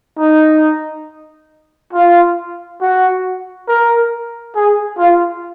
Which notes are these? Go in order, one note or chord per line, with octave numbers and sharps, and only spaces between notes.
D#4
F4
F#4
A#4
G#4
F4